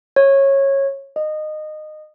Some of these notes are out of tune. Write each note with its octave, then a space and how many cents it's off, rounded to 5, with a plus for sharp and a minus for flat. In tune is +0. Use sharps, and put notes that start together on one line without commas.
C#5 -15
D#5 -20